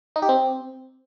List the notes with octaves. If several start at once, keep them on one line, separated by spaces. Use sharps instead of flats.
D#4
G4
C4